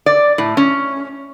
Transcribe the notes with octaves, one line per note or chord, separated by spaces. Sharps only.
D5
A2
C#4